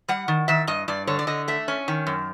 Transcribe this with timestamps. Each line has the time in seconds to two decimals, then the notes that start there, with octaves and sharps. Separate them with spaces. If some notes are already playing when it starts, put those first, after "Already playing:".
0.08 G3 F#5
0.28 D#3
0.48 D#3 E5
0.67 G2 D#5
0.88 G2 D5
1.07 D3 C#5
1.19 D5
1.27 D3 D#5
1.48 A3 E5
1.68 C#4
1.88 D#3
2.07 F#2